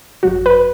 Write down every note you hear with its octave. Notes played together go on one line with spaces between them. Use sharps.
G#1 F#2 F#3 F#4
B4